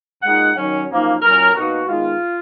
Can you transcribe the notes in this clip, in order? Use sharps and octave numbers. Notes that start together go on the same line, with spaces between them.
A#2 G#3 D#4 F#5
D#3 F#3 C#4
F#2 F3 A#3 D#4
A#2 F#3 C#4 A#4
B2 A#3 D#4 F#4
D#3 G#3 B3 F4